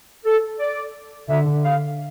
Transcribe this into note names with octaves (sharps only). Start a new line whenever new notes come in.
A4
D5
D3 E5
F5